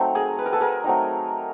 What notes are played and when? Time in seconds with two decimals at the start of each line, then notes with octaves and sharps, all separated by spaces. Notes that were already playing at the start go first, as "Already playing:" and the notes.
Already playing: F#3 A3 C4 D#4
0.15 G#4 A#4
0.39 B4
0.46 A#4
0.52 A4 B4
0.61 G#4 A#4
0.84 F#3 A3 C4 D#4